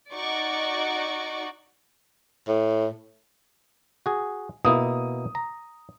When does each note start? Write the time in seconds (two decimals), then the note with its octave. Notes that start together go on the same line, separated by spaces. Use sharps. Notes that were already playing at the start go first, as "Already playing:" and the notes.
0.12 D#4 F#4 D5 C#6 D6
2.48 A2
4.06 F#4 G#4
4.65 B2 A#3 E4 D#6
5.35 A#5